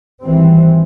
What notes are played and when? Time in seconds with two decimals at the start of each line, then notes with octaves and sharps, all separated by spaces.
0.23 G#1 E3 G3 C4